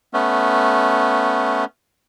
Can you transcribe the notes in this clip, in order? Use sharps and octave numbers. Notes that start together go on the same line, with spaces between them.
A3 B3 C#4